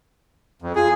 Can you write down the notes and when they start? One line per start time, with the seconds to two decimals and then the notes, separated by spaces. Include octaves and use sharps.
0.62 F2
0.75 F4 G#4